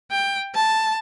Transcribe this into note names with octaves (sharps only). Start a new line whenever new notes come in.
G5
A5